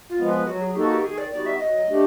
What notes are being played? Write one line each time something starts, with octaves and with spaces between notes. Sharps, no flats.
F4
F3 G#3 B3
B4
F#3 F#4
G#4
A#3 D#4 F#4 G4 A4
G4
D#3 G#4
D5
G3 B3 D#4 F#4 D5
E5
F#3 D#5
A3 D4 G4